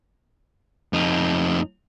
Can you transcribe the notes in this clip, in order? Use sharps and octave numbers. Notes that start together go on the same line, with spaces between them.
F2 D#4